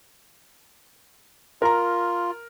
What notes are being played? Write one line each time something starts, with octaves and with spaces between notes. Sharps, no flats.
F4 A#4 A#5